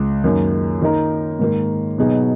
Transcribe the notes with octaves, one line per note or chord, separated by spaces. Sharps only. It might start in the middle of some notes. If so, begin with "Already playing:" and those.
Already playing: C#2
F#2 D#3 A#3
D#3 A#3 D#4 A#4
G#2 D#3 A#3
B2 F#3 B3 D#4 G#4